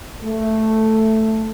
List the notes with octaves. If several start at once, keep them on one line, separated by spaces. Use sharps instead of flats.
A3